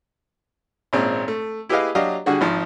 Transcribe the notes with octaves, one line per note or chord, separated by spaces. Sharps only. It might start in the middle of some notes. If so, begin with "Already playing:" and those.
G#1 A#2 G#3 C4 C#4
A3
E4 G4 G#4 B4 D#5 F5
F#3 D4 G4 D#5 F5
D3 G3 F#4 G#4
G#1 F3 D#4